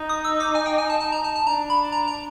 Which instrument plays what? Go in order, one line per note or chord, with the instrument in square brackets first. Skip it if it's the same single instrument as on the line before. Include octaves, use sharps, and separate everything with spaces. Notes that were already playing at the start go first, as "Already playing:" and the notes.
Already playing: [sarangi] D#4
[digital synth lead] D#6
E6
D6
G#5
G5
G#5
A5
A5
A#5
A5
A5
[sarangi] D4 [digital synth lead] A#5
[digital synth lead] B5
A#5
A#5